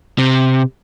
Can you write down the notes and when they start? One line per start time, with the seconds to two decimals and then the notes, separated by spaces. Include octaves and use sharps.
0.18 C3